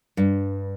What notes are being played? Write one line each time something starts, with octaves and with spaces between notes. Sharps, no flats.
G2